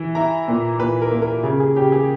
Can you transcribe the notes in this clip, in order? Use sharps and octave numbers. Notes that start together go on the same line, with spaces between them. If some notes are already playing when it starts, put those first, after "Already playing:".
Already playing: E3
E4 A#5
A#2
A#2 B4
A#4
A#3
A#4
C#3
G#4
C#3 G4
G#4